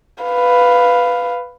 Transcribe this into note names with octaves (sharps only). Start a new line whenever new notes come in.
B4 F5